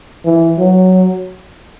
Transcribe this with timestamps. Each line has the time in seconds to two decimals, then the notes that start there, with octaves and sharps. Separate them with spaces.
0.25 E3
0.59 F#3